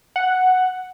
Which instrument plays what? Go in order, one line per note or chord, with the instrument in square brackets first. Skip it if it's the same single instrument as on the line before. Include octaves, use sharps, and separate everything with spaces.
[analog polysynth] F#5